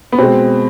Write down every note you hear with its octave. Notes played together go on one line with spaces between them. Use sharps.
B3
B2 G#3 C4